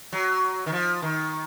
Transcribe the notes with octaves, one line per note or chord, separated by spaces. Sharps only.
F#3
D#3
F3
D#3